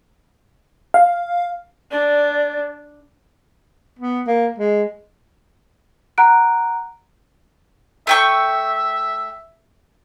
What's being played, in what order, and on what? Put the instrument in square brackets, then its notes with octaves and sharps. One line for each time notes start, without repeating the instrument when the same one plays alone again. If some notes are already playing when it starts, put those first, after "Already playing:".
[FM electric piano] F5
[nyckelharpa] D4 [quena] D5
[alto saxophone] B3
A#3
G#3
[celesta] F#5 A#5 F#6 D7
[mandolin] A3 G5 C#6 [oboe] E5